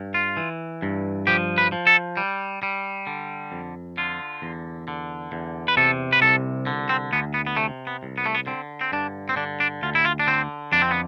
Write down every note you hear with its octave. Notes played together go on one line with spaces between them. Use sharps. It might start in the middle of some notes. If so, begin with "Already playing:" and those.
Already playing: G2
F4
E3
G2
F3 G4
B4
F3
A4
G3
G3
D3
F2
D3 F4
E2
D3
E2
B4
C3 A4
B4
C2 A4
D3
C4
D2 B3
B3
B3
C3 A3
B3
C2
B3
A3
B3
D3 C4
C4
G2 D4
C4
D3 D4
D4
D2 F4
E4
F4
D4
D3 C4
F2 D4
C4
B3